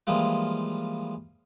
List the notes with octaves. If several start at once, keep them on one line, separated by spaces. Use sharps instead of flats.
E3 F3 G3 G#3 A#3 F4